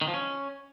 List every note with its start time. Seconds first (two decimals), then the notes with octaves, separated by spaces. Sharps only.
0.01 D#3
0.08 F3
0.14 C#4